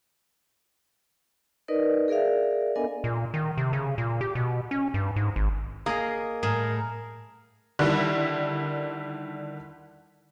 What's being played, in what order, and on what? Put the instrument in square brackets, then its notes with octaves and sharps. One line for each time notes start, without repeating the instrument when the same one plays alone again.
[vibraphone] D#4 A#4 B4 D5 D#5
G#4 A#4 D5 E5 F5
B3 D4 A4 A#4 D#5 G#5
[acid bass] A#2
D#3
C3
C#3
A#2
G4
B2
C#4
G2
G#2
G#1
[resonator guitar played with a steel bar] A#3 [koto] G#4 D#5
[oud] A2 [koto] G#4 [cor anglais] A#4
[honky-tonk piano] D3 D#3 G3 E4